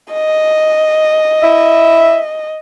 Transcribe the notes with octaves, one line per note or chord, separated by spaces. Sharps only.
D#5
E4 E5